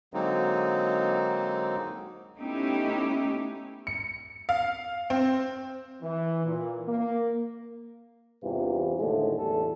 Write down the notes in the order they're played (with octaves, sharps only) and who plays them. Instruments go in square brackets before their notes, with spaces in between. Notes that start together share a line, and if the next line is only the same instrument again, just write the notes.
[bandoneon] D3 F#3 G#3 A#3 C4 D#4
[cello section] A3 B3 C#4 D#4 E4 G4
[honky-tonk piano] C#7
F5
C4
[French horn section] E3
A#2
A#3
[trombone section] E2 G2 C3 E3 F4
D#2 A2 D3 G#3 A3
B1 E2 A2 G3 A3 A4